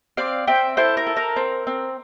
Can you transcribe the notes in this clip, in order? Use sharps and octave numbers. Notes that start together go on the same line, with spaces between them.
C4 D5 F5
C4 E5 G5
E4 A4 C5
A#4
A4
A#4
C4
C4